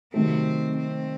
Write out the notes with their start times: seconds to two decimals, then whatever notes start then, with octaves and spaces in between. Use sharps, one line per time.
0.14 C3 D#3 F#3 A3 C4
0.78 C4